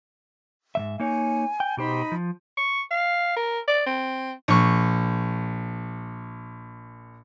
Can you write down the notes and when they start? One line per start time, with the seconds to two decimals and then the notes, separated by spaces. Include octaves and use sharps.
0.75 G#2 E3 E5
1.00 A#3 D#4 C#5 G#5
1.60 G5
1.77 B2 D#4 G4 C5 B5
2.12 F3
2.57 C#6
2.91 F5
3.36 A#4
3.67 D5
3.86 C4
4.48 A#1 C#6